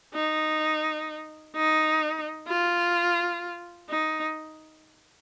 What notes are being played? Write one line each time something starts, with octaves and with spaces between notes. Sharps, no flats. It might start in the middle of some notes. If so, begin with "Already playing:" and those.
D#4
D#4
F4
D#4